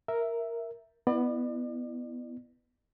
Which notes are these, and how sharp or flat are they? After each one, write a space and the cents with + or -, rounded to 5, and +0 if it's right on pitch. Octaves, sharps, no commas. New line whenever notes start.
A#4 +0 E5 +0
B3 +0 E4 +0 D5 +40